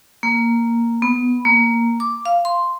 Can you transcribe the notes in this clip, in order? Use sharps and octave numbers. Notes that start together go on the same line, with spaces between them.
A#3
B3
A#3
D6
F5
C6